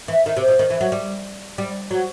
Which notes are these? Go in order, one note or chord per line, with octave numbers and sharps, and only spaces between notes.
E3
D#3
C3
B2
D#3
E3
F#3
G3
G3
F#3